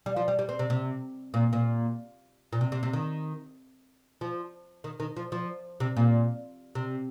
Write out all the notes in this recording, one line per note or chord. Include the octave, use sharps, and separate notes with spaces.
G3
F3
G3
G3
C4
C3
C3
A#2
A#2
A#2
C3
C3
C3
D#3
F3
D#3
D#3
F3
F3
C3
A#2
C3